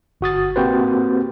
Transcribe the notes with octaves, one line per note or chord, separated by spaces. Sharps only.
G1 F#4 D#6 A6
A#3 C4 F#4 G4 B4 C5